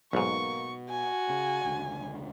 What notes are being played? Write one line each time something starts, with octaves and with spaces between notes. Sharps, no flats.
B1 G#2 B2 A#3 C#6
F#4 G#5
C#3
E1 C#2 D3